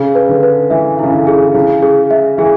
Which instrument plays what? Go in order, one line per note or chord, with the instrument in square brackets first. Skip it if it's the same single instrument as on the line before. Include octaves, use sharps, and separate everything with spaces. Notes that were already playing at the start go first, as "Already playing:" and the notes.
Already playing: [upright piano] C#3 [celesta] G#4
[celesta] B4
[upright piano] D3
[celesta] B4
[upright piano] E3 [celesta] E5
[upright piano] C#3 [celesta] E4
[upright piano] D3
[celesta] G#4
[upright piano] C#3 [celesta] E4
[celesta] G#4
E5
[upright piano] E3 [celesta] G#4